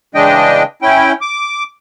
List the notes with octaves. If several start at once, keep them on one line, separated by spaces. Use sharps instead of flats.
C#3 E3 G#3 D4 D#5 G5
C#4 E4 G5
D6